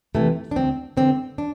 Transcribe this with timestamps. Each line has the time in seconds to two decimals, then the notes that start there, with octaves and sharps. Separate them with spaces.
0.15 C3 E3 A3
0.51 D4
0.56 D2 C4
0.97 D3 C4
1.38 D4